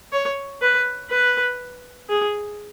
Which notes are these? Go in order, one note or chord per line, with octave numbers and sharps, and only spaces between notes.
C#5
B4
B4
G#4